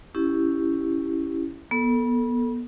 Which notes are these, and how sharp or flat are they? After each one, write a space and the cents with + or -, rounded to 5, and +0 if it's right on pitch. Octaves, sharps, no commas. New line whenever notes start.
C#4 +0 E4 +0 G4 +0
B3 -30 A4 +10